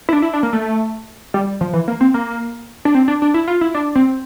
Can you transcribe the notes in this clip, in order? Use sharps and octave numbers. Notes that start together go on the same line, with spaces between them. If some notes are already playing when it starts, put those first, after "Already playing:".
E4
D4
E4
D4
A#3
A3
G3
F3
E3
A#3
C4
A#3
D4
C4
D4
D4
E4
F4
E4
D4
C4